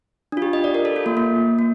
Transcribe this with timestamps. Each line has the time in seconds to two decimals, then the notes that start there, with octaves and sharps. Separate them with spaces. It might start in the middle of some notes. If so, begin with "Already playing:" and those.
0.32 D4
0.37 F4
0.42 G4
0.53 D#5
0.64 D5
0.75 A#4
0.85 A4
0.96 F4
1.06 A#3
1.17 A#3
1.59 A#3